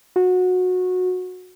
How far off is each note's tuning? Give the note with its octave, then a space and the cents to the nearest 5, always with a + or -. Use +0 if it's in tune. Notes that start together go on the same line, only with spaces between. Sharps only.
F#4 -20